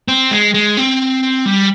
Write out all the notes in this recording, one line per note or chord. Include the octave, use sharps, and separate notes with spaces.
C4
G#3
G#3
C4
G3